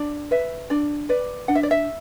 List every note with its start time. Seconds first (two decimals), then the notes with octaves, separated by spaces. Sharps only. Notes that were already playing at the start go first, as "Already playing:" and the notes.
Already playing: D4 D5
0.31 B4 E5
0.70 D4 D5
1.09 B4 D5
1.48 D4 F#5
1.55 E5
1.63 D5
1.71 E5